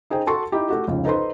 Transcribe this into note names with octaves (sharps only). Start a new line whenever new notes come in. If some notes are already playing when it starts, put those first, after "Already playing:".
D#4 G#4 C5 G5
F#4 A4 A5 C6 C#6
D#4 E4 G4
A3 F#4 G4
F1 C#2 C#3
D#4 A4 B4 C5 C6